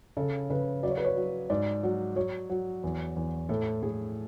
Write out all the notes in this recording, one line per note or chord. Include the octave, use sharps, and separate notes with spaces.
C#3 A4
C#3 B4
F#3 D5
C#5
B4
C#5
F#3
G#2 D5
F#3
F#3 C#5
F#3
E2
E2
A2 A4
A2 G#4